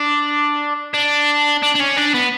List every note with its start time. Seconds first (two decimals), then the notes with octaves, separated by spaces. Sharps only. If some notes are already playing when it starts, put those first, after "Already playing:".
Already playing: D4
0.94 D4
1.63 D4
1.75 D4
1.80 C#4
1.97 D4
2.14 B3